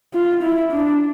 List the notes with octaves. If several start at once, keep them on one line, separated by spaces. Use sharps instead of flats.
F4
E4
D4